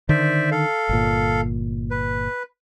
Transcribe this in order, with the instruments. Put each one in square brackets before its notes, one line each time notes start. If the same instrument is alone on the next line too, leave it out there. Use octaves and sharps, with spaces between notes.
[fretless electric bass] D3 D#3 [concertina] C5 D5 E5
[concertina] A4 F5
[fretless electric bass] G1 A#2
[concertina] B4